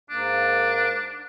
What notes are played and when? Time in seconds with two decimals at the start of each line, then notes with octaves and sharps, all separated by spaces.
0.10 G#2 A#3 D4